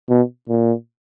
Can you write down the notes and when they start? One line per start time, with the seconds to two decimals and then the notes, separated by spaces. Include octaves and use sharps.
0.10 B2
0.49 A#2